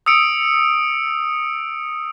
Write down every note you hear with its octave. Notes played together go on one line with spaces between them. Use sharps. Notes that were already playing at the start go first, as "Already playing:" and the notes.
D#6 E6 C#7 D7